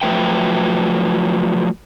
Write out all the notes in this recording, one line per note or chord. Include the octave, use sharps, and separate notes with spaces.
F3 F#3 A3 B4 E5 G5